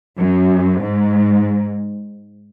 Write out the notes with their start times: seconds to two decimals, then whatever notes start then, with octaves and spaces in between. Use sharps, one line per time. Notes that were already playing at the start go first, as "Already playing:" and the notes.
0.18 F#2
0.81 G#2